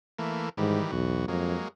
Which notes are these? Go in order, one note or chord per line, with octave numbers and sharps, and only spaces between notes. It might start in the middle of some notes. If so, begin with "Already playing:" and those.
E3 A3 A#3
G#2 D#3 E3 G3
B1 E2 F#4
F2 F#3 G#3 A#3